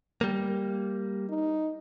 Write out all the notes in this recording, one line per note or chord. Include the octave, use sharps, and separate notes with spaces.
G3 A#3
D#4